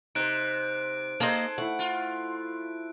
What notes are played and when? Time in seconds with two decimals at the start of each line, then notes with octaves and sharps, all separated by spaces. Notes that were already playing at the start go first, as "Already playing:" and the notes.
0.15 C3 D#4 C5 F#6 D7
1.20 A#3 G#4 A4 C5 D#5
1.58 A3 E4 F#5
1.79 F4